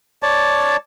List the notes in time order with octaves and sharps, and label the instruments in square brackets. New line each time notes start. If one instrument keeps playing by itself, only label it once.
[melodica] C#5 D5 A5